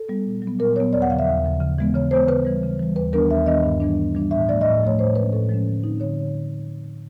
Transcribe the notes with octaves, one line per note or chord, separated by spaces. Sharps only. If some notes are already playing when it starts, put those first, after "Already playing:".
Already playing: A4
G3 B3
A#2
F#3
B3
A#2 A#4
F#3 B3 C#5
D#2 D5
F#5
C#3 F3 F5
E5
D#2
C#3 F3
C#3
E3 G#3 B3
C#3 C#5
E3 G#3 B3 C5
C#3 B4
E3 G3
C#3
E3 G3
D#2 B4
D#3 G3 B3 D4 A#4
D#2 E5
D#3 G3 B3 D4 D#5
G2
E3 G3 B3 D4
G2
E3 G3 B3 D4
A2 E5
F3 A3 D5
A2 D#5
D5
F3 A3 C#5
A2 C5
F3 G#3 C#4 B4
A2 A4
F3 G#3 C#4
D3
G3 C4 D#4
D3 C#5